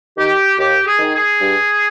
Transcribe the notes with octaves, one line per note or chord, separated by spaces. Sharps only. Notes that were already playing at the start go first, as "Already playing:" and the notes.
D#3 G4
D#2 G4
G#4
D#3
G#4
G2